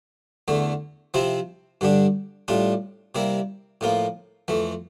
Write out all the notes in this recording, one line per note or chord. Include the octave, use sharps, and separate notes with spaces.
E2 D3 A3
C3 F3 C4 E4
G2 D3 G3 D4
A2 G3 D4 F4
C3 G3 A#3 E4
A2 F3 A#3 F4
F2 E3 A3